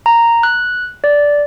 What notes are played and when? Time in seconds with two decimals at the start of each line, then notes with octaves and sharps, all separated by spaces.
0.06 A#5
0.43 F#6
1.04 D5